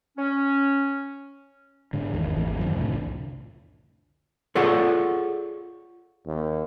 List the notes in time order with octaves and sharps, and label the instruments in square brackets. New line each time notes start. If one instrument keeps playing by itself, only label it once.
[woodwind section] C#4
[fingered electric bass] G#2 D3
G#1 E2 D#3
G#1 E3
F#2 D3 D#3
C2 F2 A2 D3
[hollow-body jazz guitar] F4 G#4 A4 C#5 D5 F#5
[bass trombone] D#2